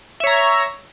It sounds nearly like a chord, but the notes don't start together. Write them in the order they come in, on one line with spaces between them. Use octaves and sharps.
E5 C#5 A#5